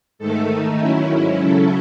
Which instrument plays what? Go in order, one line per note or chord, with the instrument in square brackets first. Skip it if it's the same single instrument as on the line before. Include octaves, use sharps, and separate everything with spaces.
[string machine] G#2 D#3 A3 A4
D#3 A3 D#4
D#3 F#3 C#4 E4
G#2 F#3 C#4 E4
C#3 F#3 C#4 E4 A4